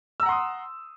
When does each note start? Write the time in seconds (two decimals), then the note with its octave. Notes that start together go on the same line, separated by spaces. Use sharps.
0.20 E6
0.23 A#5
0.26 F#5
0.29 C6
0.32 D#6